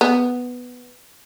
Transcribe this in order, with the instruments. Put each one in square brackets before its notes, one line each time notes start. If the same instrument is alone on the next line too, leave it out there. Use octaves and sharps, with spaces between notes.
[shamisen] B3